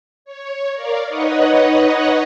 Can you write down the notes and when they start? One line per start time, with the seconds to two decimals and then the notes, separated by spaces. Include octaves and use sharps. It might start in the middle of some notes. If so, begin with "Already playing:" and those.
0.25 C#5
0.73 A#4 D5 F5
1.08 D#4 B4 C#5 D#5 F#5